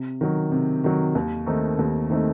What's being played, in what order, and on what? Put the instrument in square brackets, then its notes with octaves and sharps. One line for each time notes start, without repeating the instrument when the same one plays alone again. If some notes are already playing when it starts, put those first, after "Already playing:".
Already playing: [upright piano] C3
D#3 F#3
C3
D#3 F#3
D#2
D#3 A3 C4 D#4
D#2
D#3 A3 C4 D#4